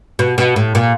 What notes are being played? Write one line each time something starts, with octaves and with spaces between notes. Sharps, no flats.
B2
B2
A2
A#2